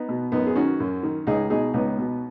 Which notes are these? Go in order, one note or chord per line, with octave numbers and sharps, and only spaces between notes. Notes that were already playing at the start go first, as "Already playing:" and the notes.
Already playing: B3 D#4
B2
F#2 B3 D#4
G#4
D#3 C#4 F#4
F#2
D#3
C#2 D#4 G#4
B2 D#4 G#4
C#2 B3 D#4
B2